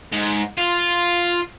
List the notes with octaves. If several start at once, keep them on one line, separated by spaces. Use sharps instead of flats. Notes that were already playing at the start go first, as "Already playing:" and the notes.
G#2
F4